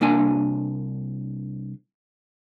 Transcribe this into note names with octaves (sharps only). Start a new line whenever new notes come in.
C2 A#3 D4 G#5